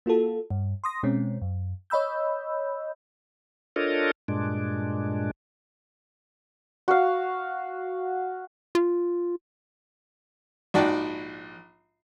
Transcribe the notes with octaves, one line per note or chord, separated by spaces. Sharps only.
A#3 F4 F#4 A4
G2
C6 D#6 A#6
B2 G#3 C4 C#4
F#2
C#5 D#5 B5 E6 G6
D4 F4 A4 A#4 C#5 D#5
G2 A#2 G#3 D4
F#4 F5
F4
A#1 G#2 F#4 D5 G5 A5